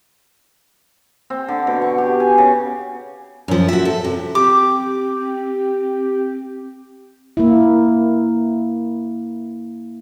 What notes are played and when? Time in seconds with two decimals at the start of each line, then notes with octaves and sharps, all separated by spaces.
1.30 C4
1.48 D3
1.67 B2
1.82 C#6
1.98 G4
2.20 G#5
2.38 C#3
3.48 F#2 F3
3.68 F#4 E5
3.85 A4
4.04 C3
4.35 C4 G4 D6
7.37 A#3 E4